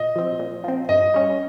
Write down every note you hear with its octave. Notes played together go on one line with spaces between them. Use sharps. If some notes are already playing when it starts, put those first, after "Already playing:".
Already playing: A#2 D#5
F3 C4
A#2
F3 C4
G2 D#5
G3 C#4